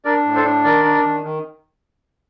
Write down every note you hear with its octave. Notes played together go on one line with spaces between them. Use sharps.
D4 A#4 D5
A2
A4 C5
D4
D#3 A#4 D5
D4
D#3
D#3